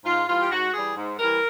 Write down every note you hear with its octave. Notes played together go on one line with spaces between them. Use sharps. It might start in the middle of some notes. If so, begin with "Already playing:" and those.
G#2 F4
E3 G3 F4
G4
G#2 F#4
E3 G3 G#4
G#2
E3 G3 A#4